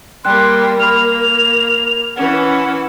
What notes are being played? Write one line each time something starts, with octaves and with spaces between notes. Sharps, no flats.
G3 A#3 G5 C6 F#6
A#3 B5 F6 F7
E3 C#4 F#5